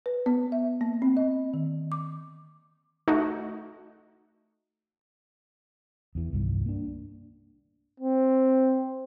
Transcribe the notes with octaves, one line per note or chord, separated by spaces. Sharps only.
B4
B3
E5
A#3
C4
D#5
D#3
D6
A3 D#4 F#4
E2 E3
C2 G2 D#3
A#3 D4
C4